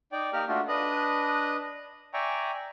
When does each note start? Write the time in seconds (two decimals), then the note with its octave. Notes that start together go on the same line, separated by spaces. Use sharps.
0.12 D#4 D5 G5
0.33 A#3 D#4 G4 A#4 F6
0.48 A3 D4 F4 F#4
0.68 D4 B4 D#5 D#6 F#6
2.14 D5 E5 G5 G#5 A#5 C#6